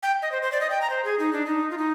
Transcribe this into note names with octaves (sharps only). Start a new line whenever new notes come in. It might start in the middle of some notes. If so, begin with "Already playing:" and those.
G5
D#5
C5
C5
D5
D#5
G5
A#5
C5
G#4
D#4
D4
D#4
F4
D#4